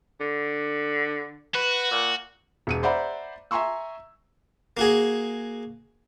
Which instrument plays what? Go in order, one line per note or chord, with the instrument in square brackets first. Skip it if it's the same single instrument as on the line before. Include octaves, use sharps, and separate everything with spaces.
[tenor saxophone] D3
[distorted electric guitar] F#4 [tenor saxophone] B4
[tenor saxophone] A#2
[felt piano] E1 C#7 D#7
C5 D5 E5 F#5 A#5 B5
E5 G#5 A#5 C6 C#6 E6
[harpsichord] A#3 F#4 G#4